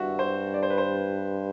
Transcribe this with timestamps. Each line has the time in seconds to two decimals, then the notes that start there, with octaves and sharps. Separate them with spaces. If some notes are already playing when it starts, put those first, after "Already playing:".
Already playing: G2 F#4 E5
0.19 C5
0.54 D5
0.63 C5
0.70 B4
0.78 C5